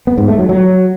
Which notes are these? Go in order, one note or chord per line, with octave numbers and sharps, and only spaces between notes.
B3
G#2
A3
F#3
F#3